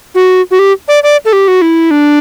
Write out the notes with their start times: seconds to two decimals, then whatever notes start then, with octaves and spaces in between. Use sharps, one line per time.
0.15 F#4
0.51 F#4
0.59 G4
0.88 D5
1.03 D5
1.25 A4
1.33 G4
1.48 F#4
1.62 E4
1.91 D4